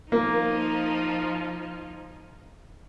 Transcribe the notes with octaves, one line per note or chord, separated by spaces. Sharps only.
F3 A#3 D#4